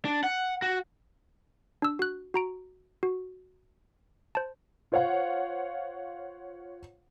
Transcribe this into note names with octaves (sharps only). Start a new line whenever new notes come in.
D4
F#5
F#4
D4 E6
F#4 F#6
F#4 A#5 D7
F#4
C5 A5
F4 C5 C#5 F5 F#5